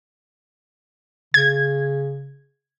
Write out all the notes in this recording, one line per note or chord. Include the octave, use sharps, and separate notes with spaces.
C#3 G#6